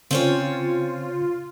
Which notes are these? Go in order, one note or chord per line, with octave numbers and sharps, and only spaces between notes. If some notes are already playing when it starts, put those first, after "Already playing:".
C#3 C4 C#4 F4 C#5